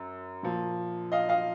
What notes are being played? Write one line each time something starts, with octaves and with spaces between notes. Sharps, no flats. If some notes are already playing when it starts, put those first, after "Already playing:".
Already playing: F#2
A#2 F3
D#5 F5
D#5 F5